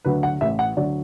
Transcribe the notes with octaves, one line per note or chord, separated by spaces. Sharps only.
D2 D3 F#3 B4
F#5
A1 A2 E3 E5
F#5
D2 D3 F#3 D5